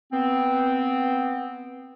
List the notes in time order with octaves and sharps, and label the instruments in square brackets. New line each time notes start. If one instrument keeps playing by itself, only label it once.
[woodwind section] B3 C4